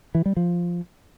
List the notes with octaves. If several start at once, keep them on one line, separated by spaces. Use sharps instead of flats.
E3
G3
F3